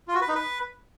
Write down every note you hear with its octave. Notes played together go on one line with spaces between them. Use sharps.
F4
F#4
B4
D#4
B4